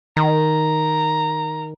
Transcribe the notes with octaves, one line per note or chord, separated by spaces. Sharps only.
D#3 A#5